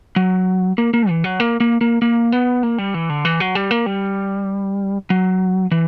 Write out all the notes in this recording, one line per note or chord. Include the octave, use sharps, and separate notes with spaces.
F#3
A#3
A#3
E3
F#3
A#3
A#3
A#3
A#3
B3
A#3
G3
E3
D3
E3
F#3
G3
A#3
G3
F#3
E3